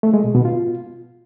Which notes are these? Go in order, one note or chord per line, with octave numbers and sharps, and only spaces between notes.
A3
G#3
B2
B2
F4